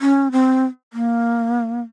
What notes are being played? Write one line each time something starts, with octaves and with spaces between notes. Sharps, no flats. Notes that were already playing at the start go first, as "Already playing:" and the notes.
C#4
C4
A#3